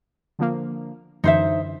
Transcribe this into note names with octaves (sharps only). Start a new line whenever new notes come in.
D3 F3 A#3
F#2 D3 E3 D#4 C5 E5